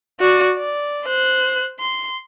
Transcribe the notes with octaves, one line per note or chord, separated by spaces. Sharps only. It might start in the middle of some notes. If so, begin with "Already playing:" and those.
F#4 D5
D5
C5 F#6
C6